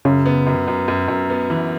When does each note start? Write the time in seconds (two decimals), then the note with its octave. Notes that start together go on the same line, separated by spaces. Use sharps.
0.05 F#2 C#3
0.26 B3
0.47 F#2
0.68 F#2
0.88 F#2
1.08 F#2
1.30 B3
1.50 E3